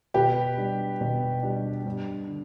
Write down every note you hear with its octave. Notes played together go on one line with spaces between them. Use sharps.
B2 G4 B4
G3 D4
B2
G3 D4
G2
D3